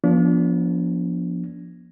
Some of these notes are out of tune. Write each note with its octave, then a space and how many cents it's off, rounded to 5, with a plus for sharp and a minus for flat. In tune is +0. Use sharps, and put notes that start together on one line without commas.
F3 +0 B3 -45 D4 -40